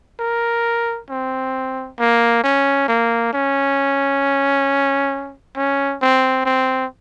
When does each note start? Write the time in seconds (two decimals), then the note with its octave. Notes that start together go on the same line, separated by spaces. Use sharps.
0.20 A#4
1.10 C4
1.99 A#3
2.44 C#4
2.88 A#3
3.33 C#4
5.56 C#4
6.01 C4
6.45 C4